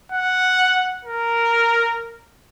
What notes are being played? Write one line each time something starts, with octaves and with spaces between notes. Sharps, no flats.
F#5
A#4